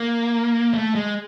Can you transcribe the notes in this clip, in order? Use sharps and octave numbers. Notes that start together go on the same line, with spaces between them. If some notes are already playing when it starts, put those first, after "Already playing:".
Already playing: A#3
A3
G#3